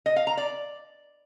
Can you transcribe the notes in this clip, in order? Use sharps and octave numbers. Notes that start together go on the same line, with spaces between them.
D#5
F5
A#5
D5